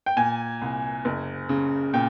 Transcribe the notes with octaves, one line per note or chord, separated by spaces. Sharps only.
G5
A#2 G#5
C2
F#1
C#3
A#2 G5